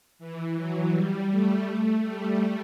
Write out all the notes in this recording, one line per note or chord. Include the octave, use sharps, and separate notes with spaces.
E3
F#3
G3
A3
A3
G3